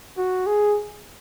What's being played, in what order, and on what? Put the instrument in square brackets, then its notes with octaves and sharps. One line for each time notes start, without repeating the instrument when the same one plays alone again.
[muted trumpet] F#4
G#4